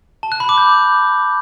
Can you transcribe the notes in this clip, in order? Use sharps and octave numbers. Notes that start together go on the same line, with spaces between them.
A5
F#6
B5
D6
G6